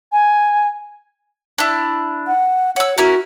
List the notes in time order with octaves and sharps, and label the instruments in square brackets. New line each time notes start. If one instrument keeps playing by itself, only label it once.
[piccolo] G#5
[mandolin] D4 E4
[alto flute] F#5
[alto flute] C#5 [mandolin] F#5 E6
[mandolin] C#4 E4 A#4 [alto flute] F#4